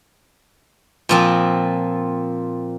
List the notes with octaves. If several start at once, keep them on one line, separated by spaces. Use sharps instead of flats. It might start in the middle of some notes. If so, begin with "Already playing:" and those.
A#2 F3 C4